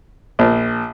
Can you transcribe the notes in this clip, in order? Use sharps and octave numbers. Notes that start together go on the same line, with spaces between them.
A#1